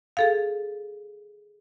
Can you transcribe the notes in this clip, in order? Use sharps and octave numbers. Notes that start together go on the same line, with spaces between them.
G#4 A4 F5